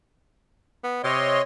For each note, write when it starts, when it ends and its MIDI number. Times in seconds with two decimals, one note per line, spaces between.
0.84 1.02 59
1.04 1.40 48
1.04 1.42 73
1.04 1.42 75
1.04 1.42 84